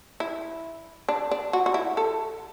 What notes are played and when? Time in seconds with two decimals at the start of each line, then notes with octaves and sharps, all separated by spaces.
0.20 E4
1.09 D4
1.31 D4
1.53 F#4
1.66 F#4
1.74 E4
1.97 A4